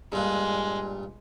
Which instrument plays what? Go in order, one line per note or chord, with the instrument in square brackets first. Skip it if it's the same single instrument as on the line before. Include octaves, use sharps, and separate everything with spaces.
[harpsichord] G2 A#2 [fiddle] G#3